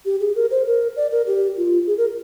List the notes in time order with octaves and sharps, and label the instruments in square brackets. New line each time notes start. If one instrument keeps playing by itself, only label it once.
[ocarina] G4
G#4
A#4
C5
A#4
D5
A#4
G4
F4
G#4
A#4